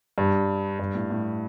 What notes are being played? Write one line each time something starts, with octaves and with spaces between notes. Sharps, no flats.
G2
G2
A2
A2